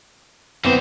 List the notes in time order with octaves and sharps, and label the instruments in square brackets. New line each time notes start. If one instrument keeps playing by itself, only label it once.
[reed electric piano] F#2 B3 [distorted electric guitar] D3 C5 [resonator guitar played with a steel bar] E3 C4